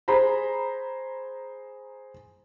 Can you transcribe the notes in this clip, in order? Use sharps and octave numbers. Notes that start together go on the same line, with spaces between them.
G#4 C5 A#5 B5